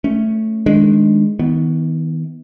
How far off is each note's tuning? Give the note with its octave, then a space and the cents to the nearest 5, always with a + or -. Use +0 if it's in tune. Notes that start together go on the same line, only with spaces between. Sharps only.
A3 +0 C#4 +0
D#3 +0 G#3 +0 D4 +0
D#3 +40 B3 +0